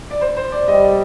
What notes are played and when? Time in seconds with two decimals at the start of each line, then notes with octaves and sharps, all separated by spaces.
0.11 D5
0.21 C5
0.37 C5
0.52 D5
0.68 G3 D#5